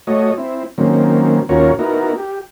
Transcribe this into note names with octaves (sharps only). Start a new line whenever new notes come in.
A3 F#4 C#5 D#5
C4 E4
D#3 F#3 A#3 C4 C#4
D#2 C#4 F4 F#4 A#4 C#5
B3 D#4 E4 F#4 A#4
G4